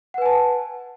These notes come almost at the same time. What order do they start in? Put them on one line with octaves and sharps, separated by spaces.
F#5 B4 G#5 A5